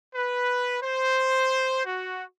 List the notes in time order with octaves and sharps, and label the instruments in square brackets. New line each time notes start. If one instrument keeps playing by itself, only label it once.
[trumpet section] B4
C5
F#4